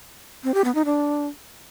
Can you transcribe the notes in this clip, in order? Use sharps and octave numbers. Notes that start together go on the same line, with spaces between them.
C4
G4
B3
D#4
D4